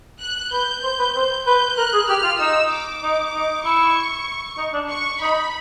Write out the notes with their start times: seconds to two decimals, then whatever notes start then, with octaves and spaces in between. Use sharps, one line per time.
0.20 F#6
0.52 B4 G6
0.83 C5
0.99 B4
1.15 C5
1.46 B4 G6
1.77 A#4 F#6
1.93 G#4
2.08 G4 F6
2.23 F4
2.39 D#4 E6
2.71 D6
3.03 D#4
3.34 D#4
3.65 E4 C#6
4.58 D#4
4.73 D4
4.90 C#6
5.21 D#4 B5